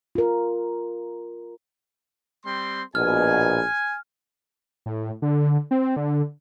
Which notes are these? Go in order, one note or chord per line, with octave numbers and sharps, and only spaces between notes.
F4 A#4
G3 C4 C6
A#1 B2 G#5 F6
A2
D3
C4
D3